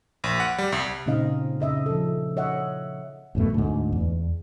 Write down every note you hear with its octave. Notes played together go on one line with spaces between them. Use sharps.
A#1
F#5
G3
C2
A#2 C#3 C4 D#4 D#5 F5
C#3 D#5 E5
F3 A4
C#5 D#5 E5 F#5
A1 F#2 B2 A3
D2 G#2
E2